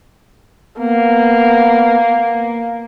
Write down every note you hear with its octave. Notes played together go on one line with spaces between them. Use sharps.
A#3 B3